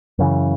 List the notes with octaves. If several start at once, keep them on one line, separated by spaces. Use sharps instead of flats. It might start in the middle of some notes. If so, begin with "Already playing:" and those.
F#2 C#3 E3